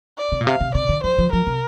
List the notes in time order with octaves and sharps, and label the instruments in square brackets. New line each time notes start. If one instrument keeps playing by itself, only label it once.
[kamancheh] D5
[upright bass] C3
A#2
[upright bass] C3 [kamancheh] F5
[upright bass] C3
[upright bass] C3 [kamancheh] D5
[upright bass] D3
[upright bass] F3 [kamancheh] C5
[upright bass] F3
[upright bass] F3 [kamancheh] A#4
[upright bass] C3